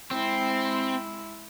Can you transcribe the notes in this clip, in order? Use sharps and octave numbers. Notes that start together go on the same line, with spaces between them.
G#3 C4 E4